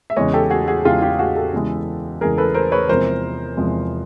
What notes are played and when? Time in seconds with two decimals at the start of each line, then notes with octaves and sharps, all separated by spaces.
0.10 E5
0.16 E2 C#3 E3 G#3 C#5 D#5
0.33 G4 A4
0.50 F#4 G#4
0.68 F#4 G#4
0.84 E2 C#3 E3 G#3 F4 G4
1.02 F4 G4
1.19 F#4 G#4
1.36 G4 A4
1.53 E2 C#3 E3 G#3
2.21 E2 C#3 E3 G#3 G#4 A#4
2.38 A4 B4
2.54 A#4 C5
2.72 B4 C#5
2.89 E2 C3 F3 G#3 A#4 C5
3.57 E2 C3 F3 G#3